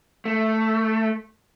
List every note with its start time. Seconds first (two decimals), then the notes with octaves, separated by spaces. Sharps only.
0.25 A3